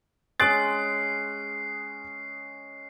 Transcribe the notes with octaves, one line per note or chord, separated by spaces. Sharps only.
G#3 C#4 D#6 F#6 A6 C7 D7